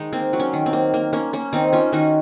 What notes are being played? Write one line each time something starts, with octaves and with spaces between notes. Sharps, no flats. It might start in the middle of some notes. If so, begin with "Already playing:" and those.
Already playing: D#3 G#3 D#4
A#3 C4
F#3
C#4
D#3
C4
A#3
A#3
A#3 C#4
A#3 C#4
D#3 C4 D#4
A#3 C#4 F4
D#3 D#4 F#4